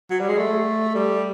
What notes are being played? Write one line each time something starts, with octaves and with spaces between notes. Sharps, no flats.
F#3
G3
G#3
A3
G3